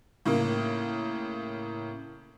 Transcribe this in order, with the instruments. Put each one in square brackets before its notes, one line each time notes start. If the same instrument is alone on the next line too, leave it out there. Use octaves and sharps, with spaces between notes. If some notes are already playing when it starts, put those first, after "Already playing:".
[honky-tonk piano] A2 C#3 A#3